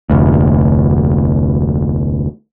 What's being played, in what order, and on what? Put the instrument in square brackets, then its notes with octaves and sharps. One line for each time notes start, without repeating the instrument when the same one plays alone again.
[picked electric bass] F1 D2